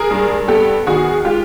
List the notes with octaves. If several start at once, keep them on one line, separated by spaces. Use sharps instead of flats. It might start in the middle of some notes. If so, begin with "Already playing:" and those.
Already playing: G#3 G#4 A#4
G2
B3 G4 A4
D#3 F#4 G#4
G#3 F4 G4